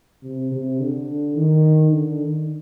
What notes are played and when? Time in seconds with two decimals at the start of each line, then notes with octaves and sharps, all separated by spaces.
0.23 C3
0.51 C3
0.79 D3
1.36 D#3
1.92 D3
2.20 D#3